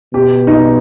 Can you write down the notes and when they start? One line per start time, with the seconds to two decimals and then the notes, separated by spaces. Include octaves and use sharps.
0.14 B2 G4
0.47 D#4